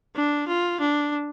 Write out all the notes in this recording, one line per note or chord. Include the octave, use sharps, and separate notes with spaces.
D4
F4
D4